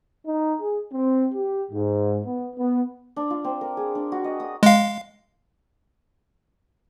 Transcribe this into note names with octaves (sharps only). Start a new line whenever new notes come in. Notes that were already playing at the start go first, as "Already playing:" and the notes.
D#4
G#4
C4
G4
G#2
B3
B3
D4
F4
C4
A#4
G#4
D4
F#4
D#5
D#6
G#3 F5